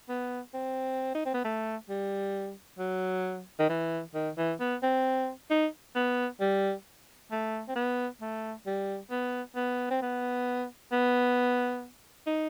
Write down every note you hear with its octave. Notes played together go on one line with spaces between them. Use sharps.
B3
C4
D#4
C4
B3
A3
G3
F#3
D#3
E3
D#3
E3
B3
C4
D#4
B3
G3
A3
C4
B3
A3
G3
B3
B3
C4
B3
B3
D#4